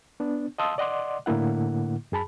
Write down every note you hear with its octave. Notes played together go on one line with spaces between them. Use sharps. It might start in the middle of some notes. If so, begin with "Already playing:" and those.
B3 D4
D#5 F5 A5 C6 D#6 E6
D5 D#5 F#5 C6 D6
A2 D3 A#3 E4 F#5
F#2 G#4 A5 B5